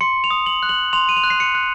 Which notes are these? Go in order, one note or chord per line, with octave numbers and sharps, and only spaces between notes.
C6 C#7
F7
D#6
F#7
F#6
F#7
C6 F7
D#7
F7
F#6
C7
C#7
F#6